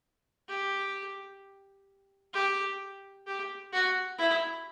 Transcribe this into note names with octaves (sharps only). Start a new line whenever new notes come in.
G4
G4
G4
F#4
E4